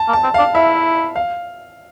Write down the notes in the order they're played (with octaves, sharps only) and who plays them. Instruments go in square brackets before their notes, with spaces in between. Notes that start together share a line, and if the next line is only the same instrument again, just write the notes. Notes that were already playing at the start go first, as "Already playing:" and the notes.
Already playing: [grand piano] A5
[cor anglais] A#3
[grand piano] A5
[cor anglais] C4
[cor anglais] D4 [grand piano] F5
[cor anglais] E4 [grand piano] E5
[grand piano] F5